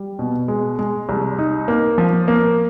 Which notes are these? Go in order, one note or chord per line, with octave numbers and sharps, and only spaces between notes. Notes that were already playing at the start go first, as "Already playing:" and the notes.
Already playing: G3
B2
G#3
G#3
C2
D#4
A#3
F3
A#3